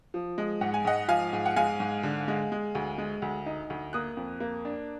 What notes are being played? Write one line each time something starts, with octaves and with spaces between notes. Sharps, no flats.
F3
G#3
G#2 F#5
G#5
G#2 D#5 F#5
F3 F5 G#5
G#2
F#5
G#3 F5 G#5
G#2
D3
G#3
G#3
D2
G#3
D2
D#4
D2
A#3 D#6 F#6
F2
A#3
D4